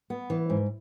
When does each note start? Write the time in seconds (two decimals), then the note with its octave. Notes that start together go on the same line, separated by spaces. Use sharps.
0.10 B3
0.30 E3
0.50 G#2